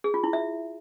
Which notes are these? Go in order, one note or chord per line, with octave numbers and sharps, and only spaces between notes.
G#4
F4
E4
E5